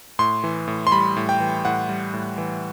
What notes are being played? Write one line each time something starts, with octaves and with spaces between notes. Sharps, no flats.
A2 C6
E3
A2
C6
G3 B5
A2
G5
E3
A2 F#5
G3
A2
E3